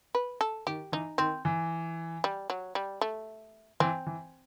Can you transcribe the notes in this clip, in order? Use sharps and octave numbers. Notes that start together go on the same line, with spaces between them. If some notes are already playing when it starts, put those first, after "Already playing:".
B4
A4
D#3 G4
E3 D#4
D#3 C4
E3
G3
F#3
G3
A3
E3 C4
E3